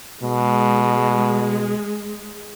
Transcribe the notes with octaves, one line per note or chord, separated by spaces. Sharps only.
B2 G#3